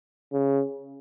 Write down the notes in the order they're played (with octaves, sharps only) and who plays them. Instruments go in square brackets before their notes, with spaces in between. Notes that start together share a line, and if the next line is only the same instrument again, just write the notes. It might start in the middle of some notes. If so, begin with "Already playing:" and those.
[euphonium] C#3